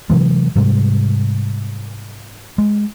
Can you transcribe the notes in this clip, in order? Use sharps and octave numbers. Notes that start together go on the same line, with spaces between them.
C3 E3 F#3 G#3
G#2 C3 G3 G#3
G#3